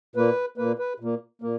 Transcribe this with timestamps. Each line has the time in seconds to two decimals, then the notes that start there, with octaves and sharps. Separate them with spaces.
0.16 A#2 A#3 B4
0.57 A#2 A#3 B4
0.79 B4
1.00 A#2 A#3
1.42 A#2 A#3